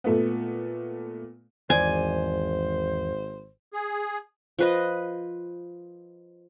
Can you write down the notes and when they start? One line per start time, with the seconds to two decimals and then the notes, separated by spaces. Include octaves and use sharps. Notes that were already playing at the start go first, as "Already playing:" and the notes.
0.04 A#2 A3 B3
1.70 G#1 E2 C5 D5 G#5
3.73 G#4
4.59 F3 B4 D#5